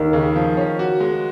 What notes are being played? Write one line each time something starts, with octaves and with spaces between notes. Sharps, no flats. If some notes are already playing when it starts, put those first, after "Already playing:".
Already playing: D#2 D#3
C#3
F3
C#4
F#4
G#3